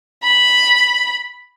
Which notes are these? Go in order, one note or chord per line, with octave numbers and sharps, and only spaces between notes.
B5